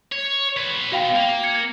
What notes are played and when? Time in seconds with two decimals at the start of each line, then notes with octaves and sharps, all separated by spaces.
0.12 C#5
0.57 B4 C#5
0.92 B2 D#4 F#4 F5 G5
1.16 A#3
1.43 G#6 C#7